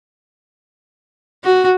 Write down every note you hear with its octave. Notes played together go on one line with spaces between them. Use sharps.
F#4